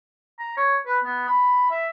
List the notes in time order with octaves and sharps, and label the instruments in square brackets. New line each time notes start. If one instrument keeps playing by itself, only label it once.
[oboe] A#5
C#5
B4
B3
B5
E5